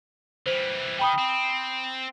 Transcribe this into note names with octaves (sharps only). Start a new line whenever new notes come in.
E3 G3 C5
D#3 G5 B5 D#6
C4